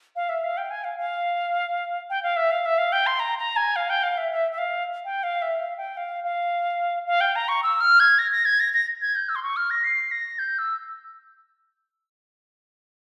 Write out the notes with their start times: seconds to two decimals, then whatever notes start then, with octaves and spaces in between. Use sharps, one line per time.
0.16 F5
0.29 E5
0.44 F5
0.57 G5
0.71 G#5
0.84 F5
0.98 F5
2.10 G5
2.23 F5
2.36 E5
2.51 F5
2.65 E5
2.78 F5
2.92 G5
3.07 C6
3.19 A#5
3.39 A#5
3.56 G#5
3.76 F5
3.90 G5
4.03 F5
4.17 E5
4.31 E5
4.52 E5
4.58 F5
5.05 G5
5.23 F5
5.42 E5
5.59 F5
5.78 G5
5.97 F5
6.24 F5
7.07 F5
7.21 G5
7.36 A#5
7.49 C#6
7.63 E6
7.81 F6
8.00 G#6
8.19 A#6
8.31 A#6
8.45 G#6
8.60 A#6
8.74 A#6
9.02 G#6
9.16 G6
9.29 E6
9.35 C6
9.43 C#6
9.56 F6
9.70 A#6
9.84 C7
10.11 A#6
10.39 G6
10.58 E6